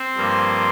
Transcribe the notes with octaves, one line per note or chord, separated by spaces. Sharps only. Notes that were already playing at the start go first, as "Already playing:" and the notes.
Already playing: C4 C5
G2 F3 A#3